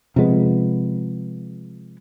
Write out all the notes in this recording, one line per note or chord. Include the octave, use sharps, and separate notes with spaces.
C3 F3 G#3 B3